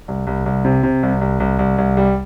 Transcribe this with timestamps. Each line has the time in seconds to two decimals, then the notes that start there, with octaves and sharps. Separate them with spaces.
0.08 C2
0.27 C2
0.46 C2
0.65 C3
0.83 C3
1.03 C2
1.21 C2
1.40 C2
1.59 C2
1.78 C2
1.97 G3